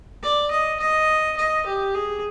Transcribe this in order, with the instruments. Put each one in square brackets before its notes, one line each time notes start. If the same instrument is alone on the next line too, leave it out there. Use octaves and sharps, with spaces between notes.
[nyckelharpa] D5
D#5
D#5
D#5
G4
G#4